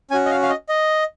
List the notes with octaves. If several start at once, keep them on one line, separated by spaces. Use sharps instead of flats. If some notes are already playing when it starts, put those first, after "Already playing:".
C#4 F#4 G#5
D#5
F5
F5
D#5
D#5